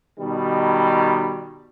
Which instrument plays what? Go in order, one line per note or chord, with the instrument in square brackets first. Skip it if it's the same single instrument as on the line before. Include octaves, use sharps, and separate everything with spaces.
[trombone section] B2 D#3 G3